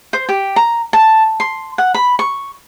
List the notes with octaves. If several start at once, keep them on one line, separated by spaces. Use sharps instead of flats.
C5
G4
A#5
A5
C6
F#5
B5
C#6